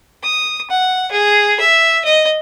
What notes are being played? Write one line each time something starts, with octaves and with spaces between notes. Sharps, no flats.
D#6
F#5
G#4
E5
D#5